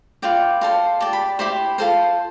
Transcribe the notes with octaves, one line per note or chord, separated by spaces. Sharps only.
F4 B4 D5 G5
F4 A4 C5
G4 D5 A5
B5
E4 G4 C5 B5
F4 A4 C5